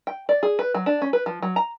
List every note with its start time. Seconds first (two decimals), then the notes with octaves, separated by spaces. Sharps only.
0.07 G5
0.29 D5
0.43 G#4
0.59 B4
0.74 F#3
0.86 D4
1.02 C#4
1.13 B4
1.26 F3
1.42 F#3
1.56 A#5